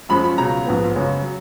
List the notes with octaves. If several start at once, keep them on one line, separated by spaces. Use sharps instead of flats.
F#2 F3 G#3 C#4 B5
B5
C#2 B2 F#3 A#5
A#1 G#2 F3 B3
F#2 C#3 G#3 C#4
F#3